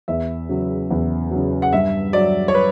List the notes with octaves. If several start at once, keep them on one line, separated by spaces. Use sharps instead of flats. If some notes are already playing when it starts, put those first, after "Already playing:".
E2 E5
C#3 F#3
E2
C#3 F#3
F#5
G2 E5
F#3 D5
C#5
B4